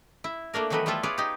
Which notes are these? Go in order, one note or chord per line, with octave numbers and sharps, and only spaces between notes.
E4
A3 A#3 D4 A#4
D#3 E3 F#3 A3 B3 B4
G3 A3 E4 F4 A4
G#4 B4 C#5 D5 F5
D#4 G4